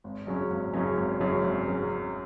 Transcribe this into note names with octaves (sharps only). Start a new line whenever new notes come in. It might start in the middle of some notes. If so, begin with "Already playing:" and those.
G#1
F#2 C#3 F#3 C#4
G#1
F#2 C#3 F#3 C#4
G#1
F#2 C#3 F#3 C#4
G#1
C#3 F#3 C#4